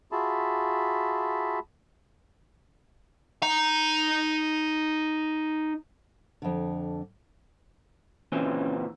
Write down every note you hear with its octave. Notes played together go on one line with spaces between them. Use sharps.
F4 F#4 G#4 E5 A5 B5
D#4 A#5
F2 D3
A#2 E3 C4 C#4